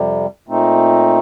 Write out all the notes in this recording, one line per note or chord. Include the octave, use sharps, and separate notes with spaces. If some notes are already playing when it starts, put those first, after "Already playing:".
Already playing: F2 C3 G3
A#2 A3 C4 D#4